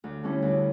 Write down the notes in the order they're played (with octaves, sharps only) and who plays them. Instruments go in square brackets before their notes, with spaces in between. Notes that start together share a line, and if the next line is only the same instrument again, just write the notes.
[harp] D2
D3 G3 C#4 E4
D2